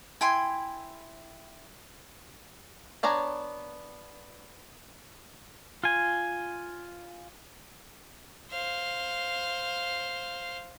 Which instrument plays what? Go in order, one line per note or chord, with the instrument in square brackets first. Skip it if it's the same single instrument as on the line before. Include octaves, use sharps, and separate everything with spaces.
[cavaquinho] E4 G5 G#5 C6
[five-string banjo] B3 D4 C#5 G#5 A#5
[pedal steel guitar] F4 G#5
[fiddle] C5 F5